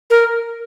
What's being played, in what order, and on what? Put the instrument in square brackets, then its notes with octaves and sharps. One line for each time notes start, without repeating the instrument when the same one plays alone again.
[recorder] A#4